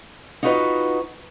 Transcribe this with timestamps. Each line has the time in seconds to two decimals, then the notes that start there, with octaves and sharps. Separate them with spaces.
0.43 D#4 F4 F#4 B4 C#5 D#5